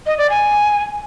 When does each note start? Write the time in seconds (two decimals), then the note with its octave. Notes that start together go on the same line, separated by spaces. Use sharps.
0.06 D#5
0.18 D5
0.30 G#5